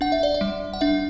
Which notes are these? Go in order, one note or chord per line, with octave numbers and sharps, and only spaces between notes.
D4 F#5
E5
D5
E5
G3
F#5
D4 E5